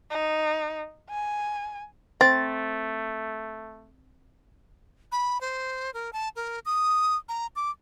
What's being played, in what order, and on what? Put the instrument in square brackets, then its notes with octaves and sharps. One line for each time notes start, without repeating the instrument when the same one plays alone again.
[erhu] D#4
G#5
[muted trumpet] A3 [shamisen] C4 [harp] A6
[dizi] B5
C5
A#4
A5
A#4
D#6
A#5
D6